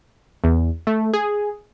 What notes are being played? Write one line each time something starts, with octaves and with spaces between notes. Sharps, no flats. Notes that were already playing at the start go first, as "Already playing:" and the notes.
E2
A3
G#4